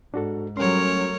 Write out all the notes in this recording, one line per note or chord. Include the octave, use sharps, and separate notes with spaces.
G#2 D4 F#4 A4
F#3 G3 A3 C#4 A#4 C#5 C6